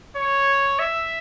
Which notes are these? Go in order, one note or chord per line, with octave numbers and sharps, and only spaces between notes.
C#5
E5